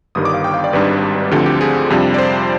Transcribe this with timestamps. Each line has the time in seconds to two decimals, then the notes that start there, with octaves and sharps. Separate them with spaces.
0.15 G1 G2 D#3 G3 D#6
0.25 D6
0.34 F5
0.44 G5
0.54 F5
0.64 D5
0.73 G#1 G#2 G3 D4 B4
1.31 D2 D3 F3 C4 G4
1.46 G4
1.61 G#4
1.90 F2 C3 G3 D4 F4
2.14 D5
2.18 C5